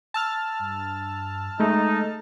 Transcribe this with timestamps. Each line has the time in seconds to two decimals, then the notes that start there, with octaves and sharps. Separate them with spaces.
0.14 A5 E6 F6
0.59 G2
1.60 G#3 A3 D#4 A4